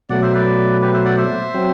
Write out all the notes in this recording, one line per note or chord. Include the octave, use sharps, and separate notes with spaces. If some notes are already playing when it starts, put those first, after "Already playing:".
B2 F#3 A3 D5 F#5
C5 E5
B4 D5
G4 B4
C5 E5
D5 F#5
C5 E5
F#3 C4